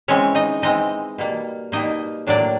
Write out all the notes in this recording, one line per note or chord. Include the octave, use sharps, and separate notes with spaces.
E3 G#3 C4 C#4 C#5
D#4 D#5
E3 G#3 C4 D#4 D#5
B2 G3 A#3
B2 G3 A#3 D#4 D#5
A2 F#3 A#3 D4 D5